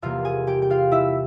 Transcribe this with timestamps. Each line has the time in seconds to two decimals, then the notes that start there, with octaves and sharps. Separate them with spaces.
0.02 E2 C3 G3 A#3 F4 F5
0.25 G#4 G#5
0.47 G4 G5
0.62 G5
0.70 F4 F5
0.92 E4 E5